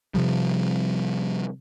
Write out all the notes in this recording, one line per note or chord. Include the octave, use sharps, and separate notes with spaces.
C3 F3 G3